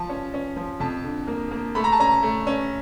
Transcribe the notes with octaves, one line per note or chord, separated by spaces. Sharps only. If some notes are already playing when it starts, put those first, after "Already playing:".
Already playing: F3 A5
C#4
C#4
F3
F2 A5
D3
A#3
A#3
A3 B5
A#5
A5
C#4 A#5
A3
C#4